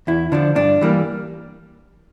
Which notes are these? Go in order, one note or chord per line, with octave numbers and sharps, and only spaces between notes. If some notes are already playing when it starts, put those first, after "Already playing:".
E2 E4
D3 F3 D4
G2 D4
E3 G3 A#3